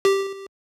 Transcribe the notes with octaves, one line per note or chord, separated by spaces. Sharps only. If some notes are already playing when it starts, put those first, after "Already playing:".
G4